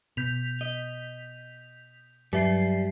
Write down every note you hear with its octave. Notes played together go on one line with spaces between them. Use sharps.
B2 G6 B6 F7
D#5
G2 F#3 G3 E5 C7